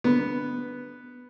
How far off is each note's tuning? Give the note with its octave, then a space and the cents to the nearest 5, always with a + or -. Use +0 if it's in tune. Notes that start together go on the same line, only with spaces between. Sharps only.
D3 +0 B3 +0